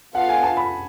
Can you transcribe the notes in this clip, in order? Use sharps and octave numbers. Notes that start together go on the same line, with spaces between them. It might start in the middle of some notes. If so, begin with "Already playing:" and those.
B3 F4 A4 F5 F#5
G#5
A5
B5